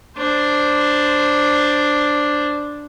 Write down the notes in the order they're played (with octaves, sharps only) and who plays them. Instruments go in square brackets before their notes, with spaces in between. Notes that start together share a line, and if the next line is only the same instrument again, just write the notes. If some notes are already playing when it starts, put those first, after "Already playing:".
[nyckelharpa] D4 C5